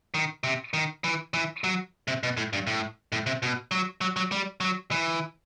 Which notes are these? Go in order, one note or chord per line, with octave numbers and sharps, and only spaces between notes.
D#3
C3
D#3
E3
E3
F#3
C3
B2
A2
G2
A2
A2
C3
B2
F#3
F#3
F#3
G3
F#3
E3